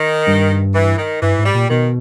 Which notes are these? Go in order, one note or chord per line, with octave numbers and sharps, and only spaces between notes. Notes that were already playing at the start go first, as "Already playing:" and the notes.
Already playing: D#3
G2
E3
D#3
G2 E3
G#2
G3
A#2
B2 D#3